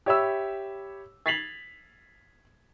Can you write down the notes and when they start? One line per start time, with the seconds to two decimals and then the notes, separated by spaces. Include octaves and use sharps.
0.06 G4 C#5 E5 B5 E6
1.26 G#6 A6 B6 C7 F7 F#7